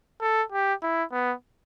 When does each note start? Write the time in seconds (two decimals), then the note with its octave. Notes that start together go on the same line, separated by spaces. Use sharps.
0.21 A4
0.52 G4
0.83 E4
1.12 B3